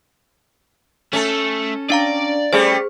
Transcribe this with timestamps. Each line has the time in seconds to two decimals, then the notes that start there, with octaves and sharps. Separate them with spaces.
1.13 A3 C#4 A4
1.90 D4 D5 F5 A#5
2.53 G3 A3 C#4 G#4 C5